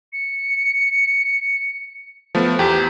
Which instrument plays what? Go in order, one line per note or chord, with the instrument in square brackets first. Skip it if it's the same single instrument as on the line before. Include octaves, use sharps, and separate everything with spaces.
[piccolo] C#7
[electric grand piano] F3 A3 B3
[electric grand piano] E2 [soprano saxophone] G4 [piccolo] B6